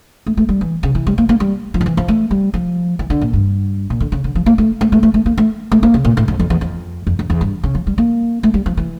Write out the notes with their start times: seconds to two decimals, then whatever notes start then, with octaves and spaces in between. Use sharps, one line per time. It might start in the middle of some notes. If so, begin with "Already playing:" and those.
0.26 A3
0.37 A3
0.49 G3
0.61 E3
0.83 C#3
0.95 E3
1.07 G3
1.18 A#3
1.29 A#3
1.40 G3
1.74 F3
1.81 D3
1.86 E3
1.97 F3
2.08 A3
2.31 G3
2.54 F3
2.99 E3
3.10 D3
3.21 A#2
3.33 G2
3.90 A#2
4.00 D3
4.12 C#3
4.24 D3
4.35 F3
4.46 A#3
4.58 A3
4.81 A3
4.92 A3
5.03 A3
5.14 A3
5.26 A#3
5.38 A3
5.72 A3
5.83 A#3
5.94 C#3
6.05 A#2
6.17 A2
6.28 F2
6.39 F2
6.50 E2
6.61 F2
7.07 F2
7.19 F2
7.30 E2
7.41 G2
7.63 C#3
7.75 F3
7.87 G3
7.98 A#3
8.43 A3
8.54 G3
8.66 F3
8.77 E3